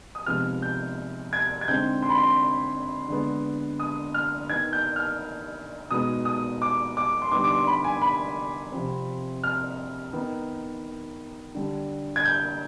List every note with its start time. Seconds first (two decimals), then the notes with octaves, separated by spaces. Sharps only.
0.15 D#6
0.26 C3 F3 G#3 B3 D#4 F6
0.62 G6
1.33 G#6
1.61 G#6
1.68 D3 G#3 C4 D#4 G6
2.02 C6
2.10 B5
2.18 C6
3.08 D3 G#3 B3
3.80 D#6
4.14 F6
4.49 D#3 B3 D#4 G#6
4.73 G6
4.96 F6
5.91 B2 G#3 B3 D#4 D#6
6.25 D#6
6.62 D6
6.97 D6
7.22 C6
7.31 D3 G3 B3 D#4 D6
7.44 D6
7.49 C6
7.67 B5
7.84 G#5
8.02 B5
8.72 C3 F3 C4
9.44 F6
10.13 D#3 B3 D#4
11.55 D3 G3 D4
12.16 G#6
12.25 G6